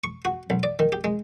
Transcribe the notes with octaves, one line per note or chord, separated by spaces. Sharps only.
C#6
F#4
B1
D5
D#3
G4
G#3